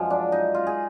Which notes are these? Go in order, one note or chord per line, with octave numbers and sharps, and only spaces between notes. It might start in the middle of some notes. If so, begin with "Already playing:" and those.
Already playing: F#2 F3 G#3 G#4
D4
D#4
F4
G#4